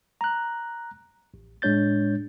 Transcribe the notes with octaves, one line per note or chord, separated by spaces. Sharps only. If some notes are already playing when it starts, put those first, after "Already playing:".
A#5 F#6
A1
A2 G#3 D4 C#5 G6 A6